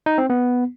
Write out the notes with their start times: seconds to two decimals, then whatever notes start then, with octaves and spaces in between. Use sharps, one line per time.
0.06 D#4
0.18 C4
0.30 B3